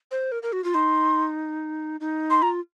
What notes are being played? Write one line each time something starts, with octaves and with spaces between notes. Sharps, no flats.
C5
A#4
A#4
F#4
F4
D#4 C6
D#4
C6
F4 A#5